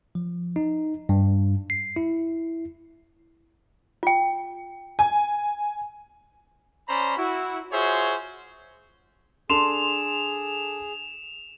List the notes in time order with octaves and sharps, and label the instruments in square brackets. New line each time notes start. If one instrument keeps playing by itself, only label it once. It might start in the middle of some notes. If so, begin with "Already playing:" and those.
[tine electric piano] F3
D#4
G2
C7
E4
[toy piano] F4 G5
[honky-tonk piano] G#5
[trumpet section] C#4 C5 D5 A#5 B5
E4 F#4
F4 F#4 G#4 C5 C#5 E5
[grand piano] D4 A4 [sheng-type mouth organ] G#4 [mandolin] C6 [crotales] E7 F7